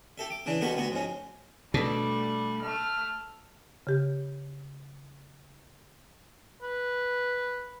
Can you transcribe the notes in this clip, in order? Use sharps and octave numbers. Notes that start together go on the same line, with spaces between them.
G4 A4 E5
D6
C#3 E3 D4
B2 D3 G3 A#3 B5 C#6
D2 B3 F#4
F2 G#2 C#4
B2 G3 A3 D4 A4
A3 F6
C#3 G4
B4